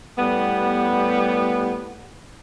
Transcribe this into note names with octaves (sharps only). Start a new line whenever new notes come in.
A2 G3 B3